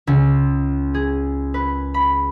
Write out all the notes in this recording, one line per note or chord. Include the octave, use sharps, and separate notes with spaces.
C#2
G#4
B4
B5